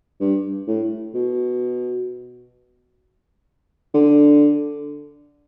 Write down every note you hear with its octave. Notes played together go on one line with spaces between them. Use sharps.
G2
A2
B2
D3